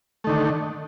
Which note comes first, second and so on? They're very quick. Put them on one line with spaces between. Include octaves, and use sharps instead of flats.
A3 D#3 D3